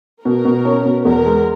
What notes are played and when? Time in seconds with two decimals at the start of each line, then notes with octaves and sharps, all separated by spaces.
0.24 B2 A#4
0.45 B2
0.65 C#4
0.85 B2
1.05 E2 A#4
1.26 G#3